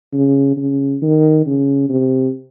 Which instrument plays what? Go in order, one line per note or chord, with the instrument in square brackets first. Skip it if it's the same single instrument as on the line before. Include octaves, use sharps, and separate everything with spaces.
[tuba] C#3
C#3
D#3
C#3
C3